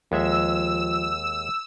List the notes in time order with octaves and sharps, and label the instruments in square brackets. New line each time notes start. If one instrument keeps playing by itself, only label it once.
[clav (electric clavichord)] D#2 G#3 E5 [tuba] F3 [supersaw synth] E6